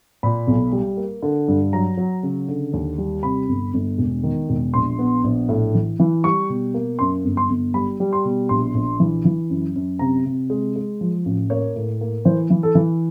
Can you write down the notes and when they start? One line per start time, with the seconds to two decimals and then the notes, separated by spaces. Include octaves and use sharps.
0.23 A#2 B5
0.48 B1
0.72 G3
0.97 A#3
1.22 D3
1.48 G2
1.73 F#3 A#5
1.97 F#3
2.23 C#3
2.48 D3
2.73 D#2
2.98 G3
3.23 C3 B5
3.49 G1
3.74 G1
3.98 E1
4.23 D#3
4.49 E1
4.74 A#1 C6
4.99 B3
5.24 A#1
5.49 A2
5.75 E3
5.99 E3
6.24 G3 C#6
6.49 B2
6.74 A#3
6.99 F#2 C6
7.24 G1
7.37 C6
7.50 G1
7.74 G3 B5
8.00 G3
8.13 C6
8.25 B2
8.49 A#1 C6
8.74 A#1
9.00 E3
9.25 E3
9.50 F#2
9.75 F#2
9.99 C3 A#5
10.26 C3
10.50 G#3
10.76 G#3
11.01 F3
11.25 A1
11.50 A#3 C#5
11.76 A2
12.01 A#3
12.25 E3 C5
12.50 E3
12.63 A4
12.75 E3